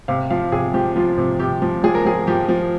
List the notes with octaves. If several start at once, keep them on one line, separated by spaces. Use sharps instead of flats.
C3 F5
F3 F5
C3 G#4
F3 G4
F3 F4
C3
C3 G4
F3
F3 G#4
A#4
F3 G#4
F3 G4
F3